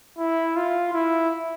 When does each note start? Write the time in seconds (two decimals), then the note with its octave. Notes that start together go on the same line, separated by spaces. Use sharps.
0.18 E4
0.56 F4
0.94 E4